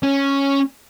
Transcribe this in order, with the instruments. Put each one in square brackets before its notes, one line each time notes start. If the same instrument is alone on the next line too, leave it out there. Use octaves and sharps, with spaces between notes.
[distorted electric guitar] C#4